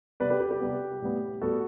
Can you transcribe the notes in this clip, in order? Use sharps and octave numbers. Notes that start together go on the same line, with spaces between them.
C3 G3 B3 B4 D5
G4 B4
G4
G4
C3 G3 B3
A2 G3 B3
A2 G3 B3 F#4 A4